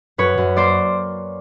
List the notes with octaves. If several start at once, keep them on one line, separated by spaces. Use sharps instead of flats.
F#2 B4 C#5
F#2
A#3 C5 D5